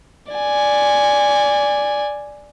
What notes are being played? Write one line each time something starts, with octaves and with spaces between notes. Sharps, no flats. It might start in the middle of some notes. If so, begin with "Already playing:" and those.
D5 G#5